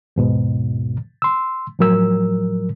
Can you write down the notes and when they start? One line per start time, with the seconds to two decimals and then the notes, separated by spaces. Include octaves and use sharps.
0.16 D#2 G#2 B2
1.22 C6 E6
1.79 A2 F3 F#3 A#4 E6